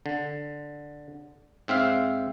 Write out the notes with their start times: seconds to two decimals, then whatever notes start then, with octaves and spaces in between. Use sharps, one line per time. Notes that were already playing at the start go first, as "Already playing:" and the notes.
0.06 D3
1.68 G#2 C4 E5 F5